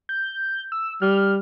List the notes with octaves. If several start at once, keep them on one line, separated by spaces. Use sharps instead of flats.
G6
E6
G3 F6